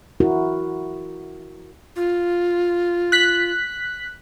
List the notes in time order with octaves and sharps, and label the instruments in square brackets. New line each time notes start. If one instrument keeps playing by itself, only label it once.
[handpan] E4 F#4 A#4
[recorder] F4
[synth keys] F#6 B6